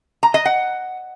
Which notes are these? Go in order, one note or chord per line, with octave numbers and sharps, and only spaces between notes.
A#5
D#5
F#5